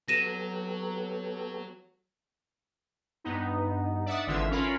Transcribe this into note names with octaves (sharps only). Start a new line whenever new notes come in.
F#3 B3 G4 A4 A#6 D#7 E7
G2 B3 D#4
D5 E5 F#5 D#6
G#1 D3 E3 F4 E5
C#4 F4 A#4 B5